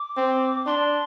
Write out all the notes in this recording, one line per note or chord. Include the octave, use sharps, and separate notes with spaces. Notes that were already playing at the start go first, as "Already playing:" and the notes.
Already playing: D6
C4
D4 C6